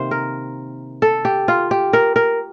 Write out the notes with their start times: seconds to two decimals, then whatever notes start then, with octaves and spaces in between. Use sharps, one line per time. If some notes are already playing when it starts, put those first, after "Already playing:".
Already playing: C3 D#3 A#3 C5
0.11 A#4
1.02 A4
1.25 G4
1.48 F4
1.71 G4
1.93 A#4
2.16 A#4